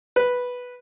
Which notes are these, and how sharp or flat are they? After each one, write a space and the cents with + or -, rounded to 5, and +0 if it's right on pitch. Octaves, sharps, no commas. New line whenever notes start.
B4 -5